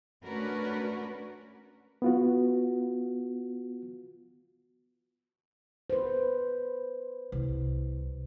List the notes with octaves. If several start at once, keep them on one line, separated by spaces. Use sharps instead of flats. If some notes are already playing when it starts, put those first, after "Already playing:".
A3 C#4 D4 F#4 A#4 B4
B3 F4 F#4
B4 C5
C2